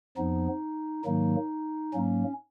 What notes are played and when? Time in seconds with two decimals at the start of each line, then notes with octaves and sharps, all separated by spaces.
0.17 F2 F3 B3 D#4
1.05 G#2 D#3 F#3 A#3 D#4
1.93 G#2 F#3 A#3 C#4